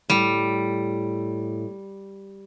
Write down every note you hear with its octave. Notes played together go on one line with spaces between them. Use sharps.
A2 G3